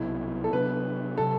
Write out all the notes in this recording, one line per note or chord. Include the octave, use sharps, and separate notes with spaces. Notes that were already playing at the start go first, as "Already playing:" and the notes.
Already playing: C2 B2 F#3 E4
A4
C3 F#3 B3 D4 B4
C3 F#3 A4